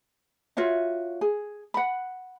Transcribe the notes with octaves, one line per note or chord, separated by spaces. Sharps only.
F4 F#4 C#5 E5
G#4
F#5 B5